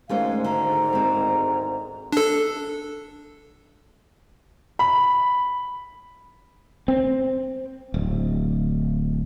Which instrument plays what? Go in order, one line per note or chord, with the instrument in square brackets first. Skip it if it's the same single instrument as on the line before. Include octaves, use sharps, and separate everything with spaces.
[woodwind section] D2 G#2 D#3 [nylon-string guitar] G#3 A3 C#4 [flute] F5
[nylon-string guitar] D3 [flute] A#5
[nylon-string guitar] G#3 C4
[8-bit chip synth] D4 A4
[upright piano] B5
[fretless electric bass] C4
D1